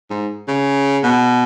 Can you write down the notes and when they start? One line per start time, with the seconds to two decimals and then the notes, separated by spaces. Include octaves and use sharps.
0.10 G#2
0.48 C#3
1.03 B2